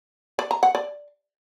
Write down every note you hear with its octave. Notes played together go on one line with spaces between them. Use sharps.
D5
A#5
F#5
D5